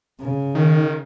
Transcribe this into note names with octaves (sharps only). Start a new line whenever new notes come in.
C#3
D#3